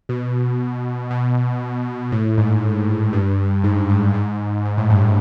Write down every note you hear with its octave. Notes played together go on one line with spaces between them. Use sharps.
B2
B2
A2
G#2
G2
G#2
G2
G#2
G#2
A2
G2